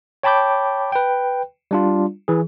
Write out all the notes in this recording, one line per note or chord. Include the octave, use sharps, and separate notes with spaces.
C#5 G5 A5 B5 D6 G6
B4 G5
G3 D4 F4
E3 G#4